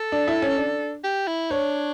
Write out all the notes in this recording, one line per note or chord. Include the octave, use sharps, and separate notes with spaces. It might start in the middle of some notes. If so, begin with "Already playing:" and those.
Already playing: A4
D4
E4
C#4
D4
G4
E4
D4 C#5